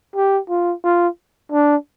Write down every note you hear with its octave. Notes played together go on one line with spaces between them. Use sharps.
G4
F4
F4
D4